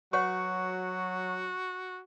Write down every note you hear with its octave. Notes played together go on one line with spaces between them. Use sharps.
F#3 F#4 B4 C#5 F#5 C#6